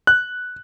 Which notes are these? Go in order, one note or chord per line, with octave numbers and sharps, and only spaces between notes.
F#6